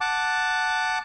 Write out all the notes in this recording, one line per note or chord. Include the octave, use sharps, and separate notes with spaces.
F#5 A5 D6